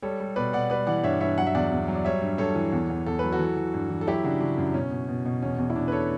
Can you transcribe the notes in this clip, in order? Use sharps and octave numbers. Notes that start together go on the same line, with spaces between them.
G3 A4 C#5
G3
B2 B4 D5
B2 D5 F#5
G3 B4 D5
E3 D5 F#5
G2 C#5 E5
G2 C#5 E5
F#3 F#5
E5
E2 D5 F#5
E2
F#3
D5
G3 C#5 E5
G2
G2 A4 C#5
E3
E2
E2
E2 A4
F#3 B4
F#4 A4
E3
E3
G2
E3
A4
F#3 E4 G4
C#3 D4 F#4
C#3 D4
F#2
B2 C#4
B2
B2
B2
E2 C#4
E2
E4
B2 D4
B4
A4 C#5